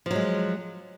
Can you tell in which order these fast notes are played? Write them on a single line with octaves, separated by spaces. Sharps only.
F3 F#3 G#3